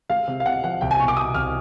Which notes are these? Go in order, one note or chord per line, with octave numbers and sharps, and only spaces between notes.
G#3 F5
C3
F5
C3 F#5
F3 F#5
C2 G5
G#5
B2 C#6
D6
B2 D#6
C2 F6